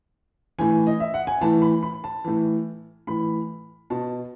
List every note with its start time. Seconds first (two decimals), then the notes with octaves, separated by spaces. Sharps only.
0.58 A2 E3 G#5
0.87 D#5
1.00 E5
1.14 F#5
1.27 G#5
1.41 A2 E3 A5
1.62 B5
1.83 B5
2.04 A5
2.24 A2 E3
3.07 A2 E3 B5
3.90 B2 A5